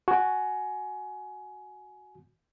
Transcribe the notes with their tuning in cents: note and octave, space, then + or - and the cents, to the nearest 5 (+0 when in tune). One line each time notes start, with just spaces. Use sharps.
F#4 +0 G#5 +20